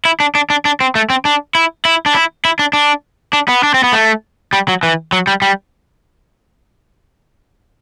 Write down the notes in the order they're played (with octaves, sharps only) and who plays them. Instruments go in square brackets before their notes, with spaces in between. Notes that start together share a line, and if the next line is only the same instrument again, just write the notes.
[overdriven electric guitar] E4
D4
D4
D4
D4
C4
A3
C4
D4
E4
E4
D4
E4
E4
D4
D4
D4
B3
D4
C4
B3
A3
G3
F#3
E3
F#3
G3
G3